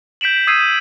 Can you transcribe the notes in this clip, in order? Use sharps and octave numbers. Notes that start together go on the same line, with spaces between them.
G6 B6 D7 E7 F#7
D#6 E6 G#6 C7 D#7